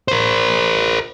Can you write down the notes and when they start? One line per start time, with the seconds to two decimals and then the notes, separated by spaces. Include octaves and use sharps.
0.08 A#4 C5